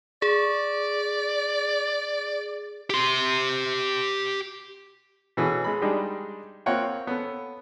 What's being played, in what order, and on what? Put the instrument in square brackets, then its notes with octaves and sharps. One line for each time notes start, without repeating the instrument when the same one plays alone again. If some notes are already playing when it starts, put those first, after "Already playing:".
[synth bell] G#4 [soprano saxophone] D5
[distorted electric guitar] G4 C6
[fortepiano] B2 E3 C#4 G#4 A4
G#3 B5
G3 G#3 D4 D#4 G4
A#3 C4 F4 C#5 F#5 G5
B3 C#4 A4